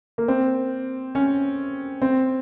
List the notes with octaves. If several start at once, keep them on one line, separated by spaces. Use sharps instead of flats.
A#3
C4
C#4
C4